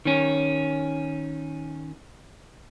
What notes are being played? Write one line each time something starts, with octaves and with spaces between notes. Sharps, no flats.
D#3 C#4